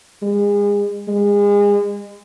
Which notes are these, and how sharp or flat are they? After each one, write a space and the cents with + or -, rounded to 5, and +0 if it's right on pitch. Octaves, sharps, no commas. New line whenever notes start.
G#3 -30
G#3 -30